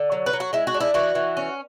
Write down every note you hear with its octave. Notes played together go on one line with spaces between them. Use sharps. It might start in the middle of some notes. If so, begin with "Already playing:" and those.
Already playing: D3
F#3
B4
F#3
F#4
G#3 E4
F#4
D4
E4
E3 F#4
E3
C#4